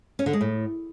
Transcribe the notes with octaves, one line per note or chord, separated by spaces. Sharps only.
C#4
D3
G#3
A2